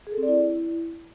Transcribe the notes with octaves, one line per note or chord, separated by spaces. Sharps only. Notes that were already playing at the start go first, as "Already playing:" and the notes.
G#4
A4
C4
D5
E4